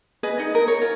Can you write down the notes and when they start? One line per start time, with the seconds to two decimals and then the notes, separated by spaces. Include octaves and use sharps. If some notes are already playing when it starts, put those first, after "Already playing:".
0.23 G#4 B4 D#5
0.38 D#4 D#5
0.55 A#4
0.68 C#5
0.82 F4